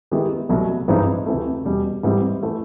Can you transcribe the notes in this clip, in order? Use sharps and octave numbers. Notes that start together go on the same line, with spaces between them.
D#3 G#3 B3 E4 G4
C2 B2 F#3 A3
G2 E3 G#3 C4 D#4
D2 C3 E3 A3
E2 B2 G3
G#2 E3 G3 C4
E3 A3